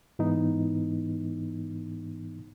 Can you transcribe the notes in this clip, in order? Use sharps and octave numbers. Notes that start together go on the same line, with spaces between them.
G#2 E3 B3 D#4